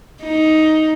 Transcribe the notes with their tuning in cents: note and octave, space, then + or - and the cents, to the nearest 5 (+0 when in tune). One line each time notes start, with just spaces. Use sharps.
D#4 +10